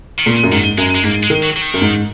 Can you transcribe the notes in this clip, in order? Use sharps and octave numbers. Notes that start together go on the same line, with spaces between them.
D#3
A#2 C#3
F#2
G#2 D#3
F#2 G#3
G#3
G#2 A#3
G#3
D#3
F#3
F#3
D#3
F#2
G#2